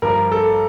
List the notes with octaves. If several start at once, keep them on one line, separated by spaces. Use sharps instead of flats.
G2 F3 A#4
A4